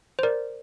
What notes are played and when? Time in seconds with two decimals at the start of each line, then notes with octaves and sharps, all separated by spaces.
0.19 C5
0.23 A#4 D5